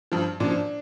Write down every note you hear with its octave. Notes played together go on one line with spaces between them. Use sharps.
G2 F3
A#2 F3 D4